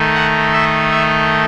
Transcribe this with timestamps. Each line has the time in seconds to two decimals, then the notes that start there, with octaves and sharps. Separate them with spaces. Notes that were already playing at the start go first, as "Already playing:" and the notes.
Already playing: D#3 A3 D#4
0.15 F#5
0.53 E5
0.92 E5